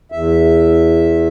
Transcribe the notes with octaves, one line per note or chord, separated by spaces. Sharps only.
E2 E5